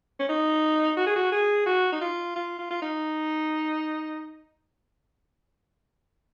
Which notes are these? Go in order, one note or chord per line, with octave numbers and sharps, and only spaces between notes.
C#4
D#4
F#4
G#4
F#4
G#4
F#4
D#4
F4
F4
F4
F4
D#4